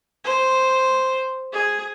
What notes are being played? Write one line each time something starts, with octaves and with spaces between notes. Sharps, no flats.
C5
G#4